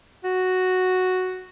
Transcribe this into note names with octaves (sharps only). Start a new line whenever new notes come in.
F#4